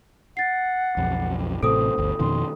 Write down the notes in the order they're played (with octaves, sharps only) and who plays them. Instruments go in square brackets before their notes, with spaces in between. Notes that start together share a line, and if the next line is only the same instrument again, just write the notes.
[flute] F#5 [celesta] A6 C7
[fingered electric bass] B1 F2
[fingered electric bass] A1 A2 C3 [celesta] A4 D#6 [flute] C5
[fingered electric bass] G1 D2
[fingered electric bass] F2 B2 D#3 [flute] C6